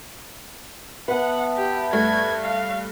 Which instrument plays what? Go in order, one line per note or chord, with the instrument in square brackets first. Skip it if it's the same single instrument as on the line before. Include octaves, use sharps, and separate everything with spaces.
[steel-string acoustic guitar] B3 B4 [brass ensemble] E5 A5 [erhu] F#5
[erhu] G4
[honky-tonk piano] G2 A3 [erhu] G#6
[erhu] F5